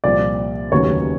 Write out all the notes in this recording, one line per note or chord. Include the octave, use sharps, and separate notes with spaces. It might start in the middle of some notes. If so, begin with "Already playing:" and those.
C2 A#2 F3 D5
F1 D#2 C#3 F#3 B3 C#5